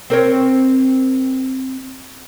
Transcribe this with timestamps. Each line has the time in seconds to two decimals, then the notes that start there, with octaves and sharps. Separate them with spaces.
0.10 C4 A#4 C#5